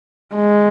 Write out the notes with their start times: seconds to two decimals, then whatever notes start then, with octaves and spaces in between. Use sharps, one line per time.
0.35 G#3